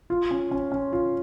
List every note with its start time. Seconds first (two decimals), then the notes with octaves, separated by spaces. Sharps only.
0.10 F4
0.31 C#4
0.51 C#4
0.72 C#4
0.93 F4